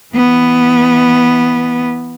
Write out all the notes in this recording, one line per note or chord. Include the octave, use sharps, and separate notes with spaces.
E3 B3